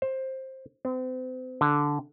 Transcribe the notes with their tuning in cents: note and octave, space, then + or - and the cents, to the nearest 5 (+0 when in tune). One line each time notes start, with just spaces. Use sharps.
C5 +15
C4 -40
D3 -5